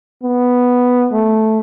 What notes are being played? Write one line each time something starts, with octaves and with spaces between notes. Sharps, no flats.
B3
A3